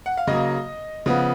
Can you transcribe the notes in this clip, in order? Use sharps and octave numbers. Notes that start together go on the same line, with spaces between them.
F#5
F5
C#3 F#3 A#3 D#5
C#3 F3 B3